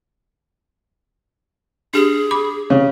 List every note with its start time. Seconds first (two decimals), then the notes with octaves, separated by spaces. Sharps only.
1.94 D4 G4 G#4
2.31 B5 D6
2.70 C#3